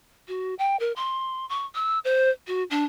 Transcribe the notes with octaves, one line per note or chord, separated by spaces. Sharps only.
F#4
G5
A#4
C6
C#6
E6
C5
F#4
D4